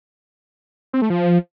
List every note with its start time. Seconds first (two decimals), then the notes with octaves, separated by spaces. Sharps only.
0.93 C4
1.02 A3
1.10 F3